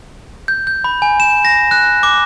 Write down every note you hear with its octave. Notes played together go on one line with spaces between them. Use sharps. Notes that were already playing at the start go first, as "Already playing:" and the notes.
G6
G6
B5
G#5
E7
A#6
F#6
D6